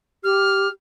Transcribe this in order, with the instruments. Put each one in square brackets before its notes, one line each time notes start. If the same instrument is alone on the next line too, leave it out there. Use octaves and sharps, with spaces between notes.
[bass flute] G4 [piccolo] F6